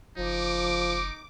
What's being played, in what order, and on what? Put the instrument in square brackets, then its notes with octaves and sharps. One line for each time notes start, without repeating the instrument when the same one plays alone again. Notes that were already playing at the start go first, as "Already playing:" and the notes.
[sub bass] F#1 [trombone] F3 [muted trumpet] D#4 [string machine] D6